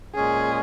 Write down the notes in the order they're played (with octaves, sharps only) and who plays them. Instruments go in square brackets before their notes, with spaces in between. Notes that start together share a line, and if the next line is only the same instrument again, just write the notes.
[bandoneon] A#2 G#3 C#4 [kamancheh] G#4